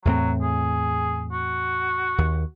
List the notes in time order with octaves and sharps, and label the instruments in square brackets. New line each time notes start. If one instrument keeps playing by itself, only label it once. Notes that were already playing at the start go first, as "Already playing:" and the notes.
[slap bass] E2 A2 C4 [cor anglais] F#3
[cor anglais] G#4
F#4
[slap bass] D#2